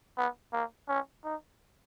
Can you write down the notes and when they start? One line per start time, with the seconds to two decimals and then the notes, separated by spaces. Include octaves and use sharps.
0.17 B3
0.53 A#3
0.88 C#4
1.24 D#4